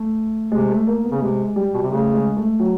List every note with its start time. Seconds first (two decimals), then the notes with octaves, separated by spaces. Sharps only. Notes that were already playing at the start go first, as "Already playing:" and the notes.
Already playing: A3
0.52 C3 G#3
0.69 A3
0.87 A#3
1.05 B3
1.11 C#3
1.21 C3 G#3
1.56 G3
1.74 B2
1.83 C3
1.91 C#3 A3
2.13 G#3
2.37 A3
2.60 F#3